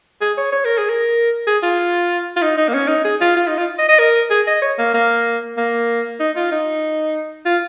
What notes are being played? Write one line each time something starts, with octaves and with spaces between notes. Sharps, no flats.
G#4
C#5
C#5
A#4
G#4
A#4
G#4
F4
F4
D#4
D#4
A#3
C#4
D#4
G#4
F4
F4
D#4
F4
D#5
D#5
A#4
G#4
D#5
C#5
A#3
A#3
A#3
D#4
F4
D#4
F4